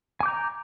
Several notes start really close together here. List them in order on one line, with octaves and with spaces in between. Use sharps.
G#5 D6 G6 A#5